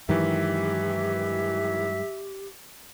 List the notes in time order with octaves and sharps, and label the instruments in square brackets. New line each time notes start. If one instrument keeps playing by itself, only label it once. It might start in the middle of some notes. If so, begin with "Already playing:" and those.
[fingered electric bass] G2 F#3 G#3 [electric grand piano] D#3 E3 [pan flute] G4 [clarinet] E5